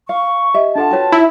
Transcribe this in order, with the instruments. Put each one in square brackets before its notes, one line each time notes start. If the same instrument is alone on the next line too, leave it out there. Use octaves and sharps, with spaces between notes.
[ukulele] F5 [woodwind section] C#6
[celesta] G4 D#5 [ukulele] E5
[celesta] D4 A4 F#5 [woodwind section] F4 A5
[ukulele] F#4 B4 [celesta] C#5 G5
[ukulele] D#4 [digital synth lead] E4